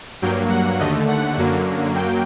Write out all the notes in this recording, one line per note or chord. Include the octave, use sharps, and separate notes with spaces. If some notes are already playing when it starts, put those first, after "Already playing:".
G2 F#3 A#3 G5
F#5
D#2 D3 A3 D#5
F#5
F#2 D3 F#3 A#3
F#2 F#3 A#3 G5